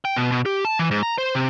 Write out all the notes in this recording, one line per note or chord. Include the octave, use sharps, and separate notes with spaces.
G5
B2
B2
G4
A5
E3
G#2
A#5
C5
C3